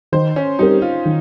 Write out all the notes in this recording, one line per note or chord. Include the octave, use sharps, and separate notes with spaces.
D#3 C5
C#4
G3 C4 D#4 G4 A#4
F4
D#3